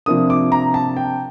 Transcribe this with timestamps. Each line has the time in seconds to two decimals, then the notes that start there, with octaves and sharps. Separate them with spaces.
0.06 C3 F3 A#3 D4 D#6
0.30 D6
0.52 A#5
0.74 A5
0.97 G5